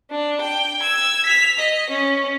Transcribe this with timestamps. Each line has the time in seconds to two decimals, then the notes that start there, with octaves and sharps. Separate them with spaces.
0.11 D4
0.41 G5
0.81 E6 G#6
1.26 B6 F7
1.59 D#5
1.90 C#4